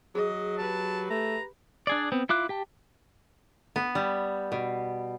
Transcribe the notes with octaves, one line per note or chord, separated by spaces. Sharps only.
F#3 G#4 D#5
G4 B4 A5
A3 A#5
D4 G#4 D5
B3 C4
E4 F4 D6 F#6
G4 G5 A5
B3
G3
B2